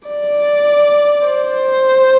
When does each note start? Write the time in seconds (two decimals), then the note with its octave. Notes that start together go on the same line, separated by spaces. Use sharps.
0.08 D5
1.27 C5